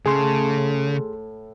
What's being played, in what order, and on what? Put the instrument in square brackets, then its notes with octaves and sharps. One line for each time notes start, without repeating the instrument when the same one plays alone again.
[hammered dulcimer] A2 [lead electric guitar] C#3 [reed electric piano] G#4 C6